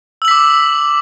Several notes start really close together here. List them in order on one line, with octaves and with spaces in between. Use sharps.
E6 F#7 B6 D6